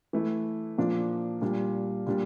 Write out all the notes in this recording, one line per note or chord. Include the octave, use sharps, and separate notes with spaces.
E3 A3 E4
A#2 F3 A#3 D4 F4
A#2 G3 D4 F4
A#2 G3 D4